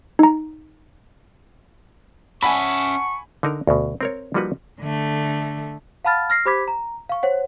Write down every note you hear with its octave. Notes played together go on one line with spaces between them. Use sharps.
D#4 A#5
C#4 E5 F#5 G#5 A5 B5 C#6
D3 D#4 A#4
D2 B2
C4 A#4 C#5
F3 G3 A#3 D#4 F#4 B4
D3 A3
F5 F#5 A5 B5 F6 A6
F6 A#6 C7
G4 C5 B5 D6 G#6 B6
A#5
F5 C#6
C5 C#5 F#5